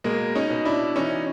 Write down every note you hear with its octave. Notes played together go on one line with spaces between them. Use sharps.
B2 G#3 A#3
C#4 D#4
B2
D4 E4
E3 C#4 D#4